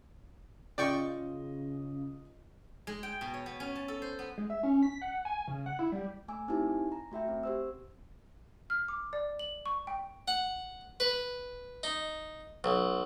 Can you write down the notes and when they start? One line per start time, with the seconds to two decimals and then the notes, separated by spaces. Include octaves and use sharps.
0.78 C#3 F4 D5 D#5 G5 C#6
2.87 G#3
3.03 G5
3.21 B2
3.34 C#5
3.46 B3
3.60 C#4
3.75 A5
3.88 A4
4.02 C5
4.19 B3
4.38 G#3
4.50 E5
4.63 C#4
4.83 B6
5.02 F#5
5.25 G#5
5.48 C#3
5.66 F#5
5.79 E4
5.92 G3
6.28 A3 G#5 D6 E6
6.48 C4 D#4 E4 G4 G#5 A5
6.92 A#5
7.11 A3 F#4 E5 G5
7.28 C4
7.43 G4 C5 E6
8.70 F6
8.88 D6
9.13 D5
9.39 F#7
9.66 C#6
9.87 G5
10.28 F#5
11.00 B4
11.83 D#4
12.64 B1